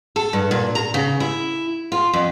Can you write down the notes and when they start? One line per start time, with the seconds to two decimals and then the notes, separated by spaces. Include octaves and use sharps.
0.16 A4
0.33 G2
0.51 A#2
0.75 A#5
0.94 C#3
1.20 E4
1.92 F4
2.13 F2